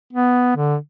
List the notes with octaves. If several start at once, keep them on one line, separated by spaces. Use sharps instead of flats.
B3
D3